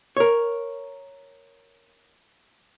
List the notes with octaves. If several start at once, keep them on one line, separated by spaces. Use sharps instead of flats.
A#4 C#5